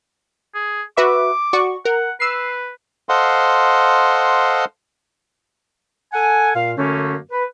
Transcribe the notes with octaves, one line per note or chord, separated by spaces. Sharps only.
G#4
F#4 B4 E5 D6
F#4 D5 C#6
A#4 F#5
B4 E6 C7
A4 C5 D#5 F5 F#5 C6
A4 F#5 G#5
A#2 F5
F#2 D3 A3 A#3 C#4
B4